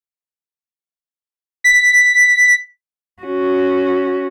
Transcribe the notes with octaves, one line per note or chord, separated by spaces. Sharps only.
B6
C#4 F#4